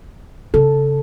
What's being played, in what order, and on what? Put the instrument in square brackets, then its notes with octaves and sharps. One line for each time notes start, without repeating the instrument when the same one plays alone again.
[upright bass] C#3 [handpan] A4